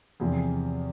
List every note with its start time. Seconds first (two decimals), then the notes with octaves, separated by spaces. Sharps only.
0.20 E2 C3 F3 G#4
0.34 G#4